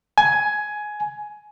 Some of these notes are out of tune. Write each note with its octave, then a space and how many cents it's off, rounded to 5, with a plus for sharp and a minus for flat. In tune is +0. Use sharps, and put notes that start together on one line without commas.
G#5 +15